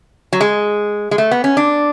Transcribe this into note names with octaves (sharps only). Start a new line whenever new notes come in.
F#3
G#3
G#3
A3
B3
C#4
D4